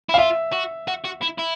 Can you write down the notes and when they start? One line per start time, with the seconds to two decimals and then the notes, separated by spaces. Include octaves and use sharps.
0.09 E4
0.14 F5
0.18 F4 E5
0.53 F#4
0.88 F#4
1.04 F#4
1.21 E4
1.38 E4